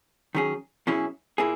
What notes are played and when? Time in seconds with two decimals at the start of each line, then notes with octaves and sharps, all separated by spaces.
0.35 D#3 F#3 C#4 G#4
0.87 B2 F#3 C#4 E4 G#4
1.38 A#2 A#3 E4 G#4